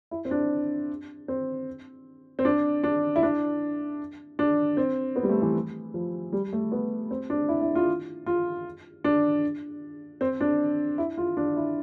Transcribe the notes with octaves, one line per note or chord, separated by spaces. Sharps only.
E4
C4
D4
C4
C4
D4
D4
E4
D4
D4
C4
B3
G3
A3
E3
F3
G3
A3
B3
C4
D4
E4
E4
F4
F4
D4
C4
D4
E4
F4
D4
E4